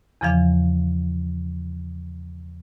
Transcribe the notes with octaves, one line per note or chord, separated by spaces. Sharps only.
E2 C#3 E3 F3 F5